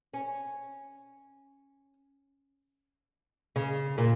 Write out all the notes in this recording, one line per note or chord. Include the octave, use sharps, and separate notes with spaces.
C#4
C#3
A#2